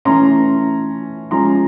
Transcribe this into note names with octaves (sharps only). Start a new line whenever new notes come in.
E3 A3 C#4 A#5 C6
F3 G#3 C#4 A#5 C6